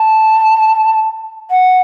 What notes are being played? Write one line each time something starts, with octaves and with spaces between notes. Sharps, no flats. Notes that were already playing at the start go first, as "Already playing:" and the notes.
Already playing: A5
F#5